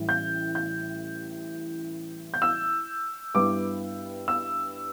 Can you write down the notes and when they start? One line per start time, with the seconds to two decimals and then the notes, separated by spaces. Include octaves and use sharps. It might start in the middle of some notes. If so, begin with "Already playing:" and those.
Already playing: A1 A2 E3 G3
0.09 G6
0.55 G6
2.34 G6
2.42 E6
3.34 G2 G3 B3 E4 D6
4.28 E6